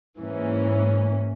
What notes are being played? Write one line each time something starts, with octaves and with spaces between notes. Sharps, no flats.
G#2 E3 A#3 C#4